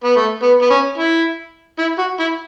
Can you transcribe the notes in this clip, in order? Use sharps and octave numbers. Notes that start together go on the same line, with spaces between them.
B3
A3
B3
B3
C#4
E4
E4
F#4
E4